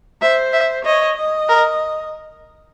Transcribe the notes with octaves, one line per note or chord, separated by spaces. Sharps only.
C5 E5
E5
C#5 D#5
D#5
A#4